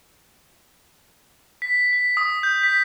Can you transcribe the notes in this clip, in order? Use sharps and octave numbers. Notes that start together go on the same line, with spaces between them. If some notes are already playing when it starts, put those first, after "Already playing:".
B6
B6
D#6
G6
B6